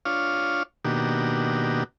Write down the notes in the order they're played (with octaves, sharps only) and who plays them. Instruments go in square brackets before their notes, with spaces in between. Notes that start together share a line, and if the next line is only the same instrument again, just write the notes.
[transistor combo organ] D4 F4 C#5 F5
B2 D#3 A#3 D4 F#4 G4